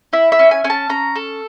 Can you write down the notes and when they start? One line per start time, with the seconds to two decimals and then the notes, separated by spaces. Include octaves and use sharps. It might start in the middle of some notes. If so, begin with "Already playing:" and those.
0.13 E4 E5
0.32 E5
0.39 C#4
0.51 G#5
0.64 C#4 G#5
0.70 A5
0.89 C#4 A#5
1.16 A4